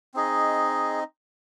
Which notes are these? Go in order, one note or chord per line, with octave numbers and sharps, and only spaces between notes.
C4 D#4 G#4 D#5